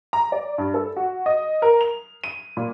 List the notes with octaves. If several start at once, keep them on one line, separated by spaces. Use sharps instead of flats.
A#5
D5
G2
A4
F#4
D#5
A#4
F7
D#7
A#2